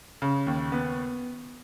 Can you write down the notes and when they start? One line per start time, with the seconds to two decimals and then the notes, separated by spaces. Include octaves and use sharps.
0.22 C#3
0.47 D#2
0.72 B3